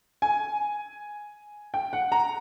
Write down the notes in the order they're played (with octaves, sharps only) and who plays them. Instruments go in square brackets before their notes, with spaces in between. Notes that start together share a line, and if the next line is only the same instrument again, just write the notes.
[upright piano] G#5
G5
F#5
A#5